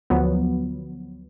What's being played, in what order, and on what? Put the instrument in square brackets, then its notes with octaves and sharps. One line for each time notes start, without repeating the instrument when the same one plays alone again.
[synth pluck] D2 F3 F#3 B3